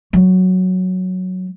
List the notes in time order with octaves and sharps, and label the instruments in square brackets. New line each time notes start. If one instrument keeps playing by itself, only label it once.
[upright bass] F#3